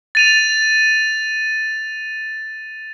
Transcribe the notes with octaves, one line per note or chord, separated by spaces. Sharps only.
A6 D#7 F7